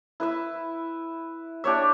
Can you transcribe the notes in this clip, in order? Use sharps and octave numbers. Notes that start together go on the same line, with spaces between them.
E4 B4 E5
D4 G4 C#5 E5